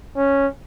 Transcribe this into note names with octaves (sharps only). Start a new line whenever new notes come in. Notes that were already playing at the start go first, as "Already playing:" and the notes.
C#4